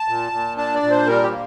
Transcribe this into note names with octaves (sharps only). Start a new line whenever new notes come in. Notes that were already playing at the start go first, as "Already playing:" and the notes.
Already playing: A5
A#2
A#2
D4 A5
D5
A#2
C5
G3 A#4
G4
A#3